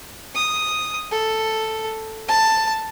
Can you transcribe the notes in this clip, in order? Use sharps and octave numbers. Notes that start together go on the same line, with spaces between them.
D#6
A4
A5